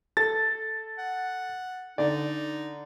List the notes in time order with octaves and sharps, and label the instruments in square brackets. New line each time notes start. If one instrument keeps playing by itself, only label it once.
[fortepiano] A4 [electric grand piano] A6
[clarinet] F#5
[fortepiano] D3 D5 [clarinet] D#4